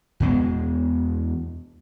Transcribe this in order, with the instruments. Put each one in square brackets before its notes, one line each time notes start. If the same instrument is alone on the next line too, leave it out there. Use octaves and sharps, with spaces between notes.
[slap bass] E2 B2 G#3